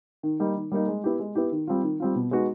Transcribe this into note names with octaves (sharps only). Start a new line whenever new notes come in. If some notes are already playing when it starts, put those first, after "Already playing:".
D#3
G3 A#3 D#4
D#3
G3 A#3 D#4
G#3
B3 E4 G4
G#3
B3 E4 G4
D#3
G3 C4 F4
D#3
G3 C4 F4
B2
G#3 B3 D#4 F#4